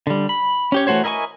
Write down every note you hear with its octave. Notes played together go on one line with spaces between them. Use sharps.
D3 G3
B5
C#4 G4 C#5
E3 A3 F#4 C5 C#5
E4 A#4 D#5 G#5 C#6